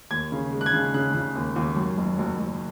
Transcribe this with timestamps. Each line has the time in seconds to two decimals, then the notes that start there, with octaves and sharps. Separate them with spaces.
0.11 D#2 G#6
0.32 C#3
0.52 G#3
0.61 F#6
0.66 G#6
0.73 C#3
0.94 C#3 F#6
1.14 C#3
1.36 D#2
1.56 D#2
1.76 F#2
1.97 F#1
2.18 F#1
2.39 F#1